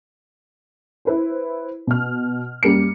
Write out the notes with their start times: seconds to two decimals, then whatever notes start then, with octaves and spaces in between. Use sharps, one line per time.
1.05 E4 B4 C5
1.87 B2 F6
2.63 F#2 G3 A#3 C#7